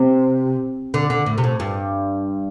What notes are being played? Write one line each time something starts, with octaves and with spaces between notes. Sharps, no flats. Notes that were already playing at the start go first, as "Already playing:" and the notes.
Already playing: C3
D3
D3
A2
C3
A2
G2